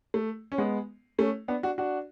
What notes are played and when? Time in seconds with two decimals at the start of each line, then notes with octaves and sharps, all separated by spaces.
0.14 A3
0.52 C#4
0.58 G#3 B3
1.18 A3 C#4
1.48 B3 D4
1.63 D4 F#4
1.78 D4 F#4